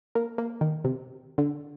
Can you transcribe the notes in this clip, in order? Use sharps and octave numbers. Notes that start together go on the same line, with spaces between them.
A#3
A#3
D#3
C3
D3